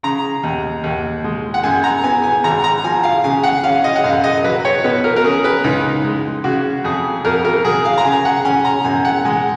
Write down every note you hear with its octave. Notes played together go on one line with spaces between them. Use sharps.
C#3 A#5
D#2
D#2
G#3
F#5
F#2 G#5
A#5
B3 G#5
G#5
G#1 A#5
A#5
F3 G#5
F5
C#3 G#5
F#5
C#4 F5
D#5
F#5
F#2 F5
D#5
F#3 B4
C#5
B2 B4
A#4
A#4
C#4 G#4
B4
C#2 D#4
G#3
C#3 F#4
F2 G#4
F2 A#4
A#4
F#3 G#4
F5
A#5
C#3 G#5
F#5
C#4 G#5
A#5
F#2 G#5
F#5
G#3 G#5